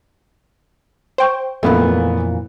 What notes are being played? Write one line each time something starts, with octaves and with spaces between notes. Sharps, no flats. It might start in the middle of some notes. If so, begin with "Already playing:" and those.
C5 G5 C#6
F2 A#2 E3 A3 B3